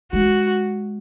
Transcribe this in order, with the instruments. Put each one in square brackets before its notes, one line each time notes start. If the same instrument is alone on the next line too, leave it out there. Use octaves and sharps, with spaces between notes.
[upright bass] G#3 [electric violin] F#4